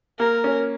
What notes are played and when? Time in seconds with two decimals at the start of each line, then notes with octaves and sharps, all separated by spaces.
0.19 A#3 A#4
0.44 C#4